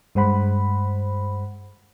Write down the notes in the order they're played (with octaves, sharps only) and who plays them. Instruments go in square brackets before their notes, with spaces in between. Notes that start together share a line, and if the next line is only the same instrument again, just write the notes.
[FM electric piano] G2 G#3 C5 F#5 B5